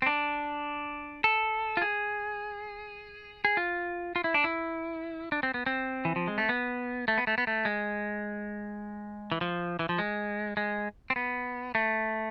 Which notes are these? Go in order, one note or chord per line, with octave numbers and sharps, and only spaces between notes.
C4
D4
A4
F4
G#4
G#4
F4
F4
E4
D4
E4
D4
C4
B3
C4
E3
F3
G#3
A3
B3
A3
B3
A3
B3
A3
G#3
E3
F3
E3
F3
G#3
G#3
C4
B3
A3